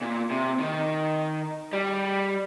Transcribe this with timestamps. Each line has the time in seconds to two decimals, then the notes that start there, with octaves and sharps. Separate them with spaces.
0.01 A#2
0.30 C3
0.59 D#3
1.73 G3